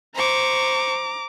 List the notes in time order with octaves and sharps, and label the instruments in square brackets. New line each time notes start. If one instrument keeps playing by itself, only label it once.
[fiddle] C5 C#6 [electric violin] A#5 D6